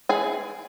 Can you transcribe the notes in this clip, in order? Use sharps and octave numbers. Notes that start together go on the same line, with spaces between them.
E3 G#4 G#5